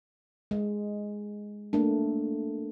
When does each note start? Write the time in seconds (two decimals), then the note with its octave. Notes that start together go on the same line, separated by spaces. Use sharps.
0.51 G#3
1.73 A3 A#3 D4